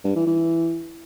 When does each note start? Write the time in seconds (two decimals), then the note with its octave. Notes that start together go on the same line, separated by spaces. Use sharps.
0.04 G2
0.16 E3
0.27 E3